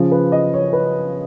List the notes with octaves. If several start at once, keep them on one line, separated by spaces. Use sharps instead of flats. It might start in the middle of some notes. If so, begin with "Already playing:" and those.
Already playing: C#3 F3
B4
D#5
C#5
B4